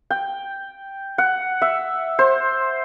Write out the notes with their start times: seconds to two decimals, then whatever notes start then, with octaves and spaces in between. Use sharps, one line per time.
0.10 G5
1.18 F#5
1.62 E5
2.19 C5